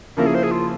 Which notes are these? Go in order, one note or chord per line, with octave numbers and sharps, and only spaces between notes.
C#3 F3 A#3 C#4 E4 A#4
G#4
C5
G#4
F4